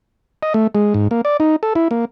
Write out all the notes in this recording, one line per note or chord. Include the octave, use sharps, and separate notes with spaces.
D#5
A3
G#3
G#2
A#3
D5
D#4
A4
E4
A#3